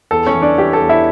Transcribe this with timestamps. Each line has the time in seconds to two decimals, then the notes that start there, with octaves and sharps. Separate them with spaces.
0.11 E2 A4
0.27 C#4 C#5
0.34 E3
0.42 D4 D5
0.58 E3 G4
0.73 A4
0.81 E2
0.89 E4 E5